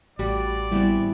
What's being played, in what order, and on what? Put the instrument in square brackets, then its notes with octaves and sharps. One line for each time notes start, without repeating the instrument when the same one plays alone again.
[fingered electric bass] A1 [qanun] G3 F#4 B5 [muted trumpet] D5
[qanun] E3 B3 C4 [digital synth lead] G3